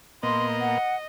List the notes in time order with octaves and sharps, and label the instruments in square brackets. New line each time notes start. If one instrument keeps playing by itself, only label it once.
[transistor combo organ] A#2 A#3 B3 [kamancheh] D#5 [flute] C6
[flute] F#5